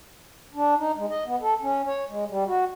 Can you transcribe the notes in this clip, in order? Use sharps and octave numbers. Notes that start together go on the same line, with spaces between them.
D4
D#4
G#3
D#5
B3
A4
C#4
C#5
G#3
G3
F#4